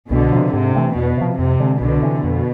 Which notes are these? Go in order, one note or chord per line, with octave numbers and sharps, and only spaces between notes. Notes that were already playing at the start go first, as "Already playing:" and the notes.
C2 B2 D3
C3 F3
G#2 C3
E3 A3 C4
E2 B2
C3 F3
F2 C3
D3 G#3
C2 B2 D3
C3 E3
F2 B2